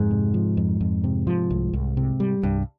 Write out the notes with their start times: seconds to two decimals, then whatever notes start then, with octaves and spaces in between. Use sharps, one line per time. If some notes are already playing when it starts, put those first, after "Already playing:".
Already playing: F2 G#2
0.11 C3
0.34 F3
0.57 F2
0.81 F2
1.04 C3
1.27 F3
1.50 C2
1.73 C2
1.97 C3
2.20 G3
2.43 C2 G2